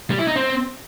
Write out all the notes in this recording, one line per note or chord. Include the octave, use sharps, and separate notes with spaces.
G3
E4
D#4
C4